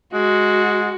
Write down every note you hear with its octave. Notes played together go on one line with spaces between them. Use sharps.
G#3 F#4